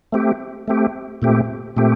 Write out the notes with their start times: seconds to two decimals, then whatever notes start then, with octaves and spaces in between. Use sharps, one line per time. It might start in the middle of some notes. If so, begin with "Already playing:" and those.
0.12 A3 C4 G4
0.68 A3 C4 G4
1.22 A#2 A3 C4 G4
1.76 A#2 A3 C4 G4